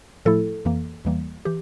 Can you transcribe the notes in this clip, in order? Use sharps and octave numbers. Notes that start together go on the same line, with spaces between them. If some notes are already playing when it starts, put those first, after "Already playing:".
A2 F3 A3 E4 A4
F2 E3 A#3
E2 E3 G3 A#3
E3 G4